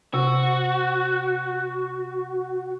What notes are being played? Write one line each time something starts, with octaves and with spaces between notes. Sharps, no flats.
C3 F#4